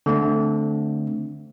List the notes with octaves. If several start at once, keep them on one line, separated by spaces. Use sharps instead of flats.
D3 A3 C4